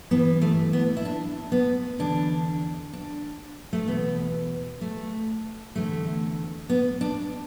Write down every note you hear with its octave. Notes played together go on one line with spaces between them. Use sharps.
G2 E3 B3
A3
B3
E4
D4
B3
E2 D3 D4
D4
A3
E2 B2 B3
A3
E2 D3 A3
B3
D4